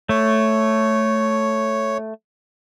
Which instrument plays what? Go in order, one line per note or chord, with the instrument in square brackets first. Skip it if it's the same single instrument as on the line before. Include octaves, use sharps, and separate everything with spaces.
[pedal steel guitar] A3 [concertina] C#5